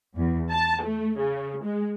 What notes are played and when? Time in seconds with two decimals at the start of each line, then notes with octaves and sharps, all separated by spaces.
0.16 E2
0.51 A5
0.82 A3
1.18 C#3
1.64 G#3